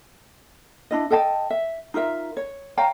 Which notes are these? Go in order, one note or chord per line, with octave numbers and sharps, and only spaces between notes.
D4 E4 D#5
A4 D#5 G5 A5
E5
D#4 F4 A#4 E5
C#5
C#5 F5 G5 A#5